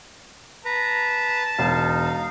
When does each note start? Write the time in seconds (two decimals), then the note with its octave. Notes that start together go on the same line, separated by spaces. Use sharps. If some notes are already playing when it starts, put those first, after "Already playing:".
0.65 B4 A5 A#5
1.59 E1 D#4 F5